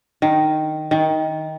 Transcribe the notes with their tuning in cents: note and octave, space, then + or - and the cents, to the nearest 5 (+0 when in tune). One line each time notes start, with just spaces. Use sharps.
D#3 -5
D#3 +15